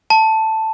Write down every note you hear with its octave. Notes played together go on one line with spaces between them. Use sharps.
A5